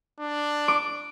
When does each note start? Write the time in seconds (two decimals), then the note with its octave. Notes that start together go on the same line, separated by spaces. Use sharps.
0.20 D4
0.68 D6